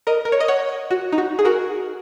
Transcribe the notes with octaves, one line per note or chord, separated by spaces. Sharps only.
A#4 D#5
A#4
C#5
D#5
C#5 F#5
F#4
D#4
F#4
G#4
F#4 A#4